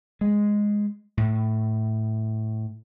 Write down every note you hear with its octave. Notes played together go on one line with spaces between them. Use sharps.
G#3
A2